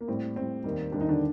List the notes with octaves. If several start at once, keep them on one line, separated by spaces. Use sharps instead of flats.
A#3
A2 G3 C4
A2 G3 C4
D#2 D#3 G3
D#2 D#3 G3 D4
D#4
D3 D4